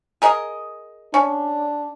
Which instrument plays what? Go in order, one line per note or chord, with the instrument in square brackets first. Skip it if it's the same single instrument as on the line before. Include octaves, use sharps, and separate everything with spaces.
[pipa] G#4 A#4 D#5
[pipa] C#4 [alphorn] D4